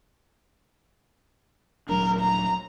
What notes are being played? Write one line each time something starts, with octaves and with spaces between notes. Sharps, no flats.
D#1 F#3 D4 A#4
A#5